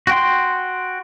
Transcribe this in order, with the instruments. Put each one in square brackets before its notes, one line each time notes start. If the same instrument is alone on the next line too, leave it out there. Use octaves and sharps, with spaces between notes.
[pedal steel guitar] F#4 G5 C6